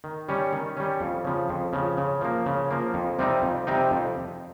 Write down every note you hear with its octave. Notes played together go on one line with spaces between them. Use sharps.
D#3
G3 C#4
D#3
G3 C#4
F2
C#3 F3
F2
C#3 F3
C#3
F3 A#3
C#3
F3 A#3
F2
C3 G3 C4 D#4
F2
C3 G3 C4 D#4
F2